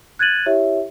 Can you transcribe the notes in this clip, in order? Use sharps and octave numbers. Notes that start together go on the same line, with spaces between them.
F#6 G#6 A6 D#7 F#7
E4 G4 C#5 E5